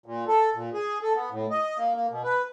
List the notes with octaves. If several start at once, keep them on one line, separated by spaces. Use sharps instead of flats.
A#2
A4
A#2
G#4
A4
B3
A2
D#5
A#3
A#3
B2
B4